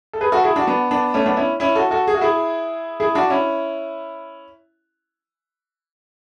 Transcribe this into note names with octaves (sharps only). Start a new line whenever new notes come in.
A4
G#4 B4
F#4 A4
E4 G#4
D4 F#4
B3 D4
B3 D4
A3 C#4
B3 D4
C#4 E4
C#4 E4
F#4 A4
F#4 A4
G#4
F#4
E4 G#4
E4 G#4
D4 F#4
C#4 E4